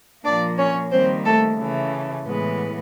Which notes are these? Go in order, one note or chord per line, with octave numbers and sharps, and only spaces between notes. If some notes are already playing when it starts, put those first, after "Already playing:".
A#2 F3 A#3 D4 D5
C#4 C#5
D#3 G3 A#3 C4 C5
A3 A4
C#3 E3 A3
A2 E3 G#3 B3